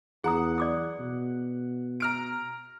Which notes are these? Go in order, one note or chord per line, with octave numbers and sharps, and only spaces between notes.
E2 G#4 F#5 A#5 D#6
D5 D6 D#6
B2
A#5 F6 D7